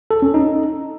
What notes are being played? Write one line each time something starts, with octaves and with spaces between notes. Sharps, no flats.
A4
C#4
D#4